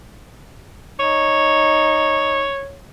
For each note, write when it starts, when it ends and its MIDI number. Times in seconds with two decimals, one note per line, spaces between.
1.00 2.46 63
1.00 2.77 73